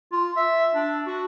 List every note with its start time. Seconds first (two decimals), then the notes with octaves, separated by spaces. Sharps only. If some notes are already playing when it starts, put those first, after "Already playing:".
0.12 F4
0.37 E5
0.74 D4
1.07 F#4